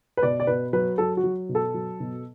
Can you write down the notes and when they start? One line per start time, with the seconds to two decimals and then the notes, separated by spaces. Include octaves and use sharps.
0.17 B4
0.23 B2 D5
0.40 D5
0.47 B2 B4
0.73 F#3 B4
0.98 F#3 A4
1.17 F#4
1.24 F#3
1.49 B2
1.55 A4
1.74 F#3
2.00 B2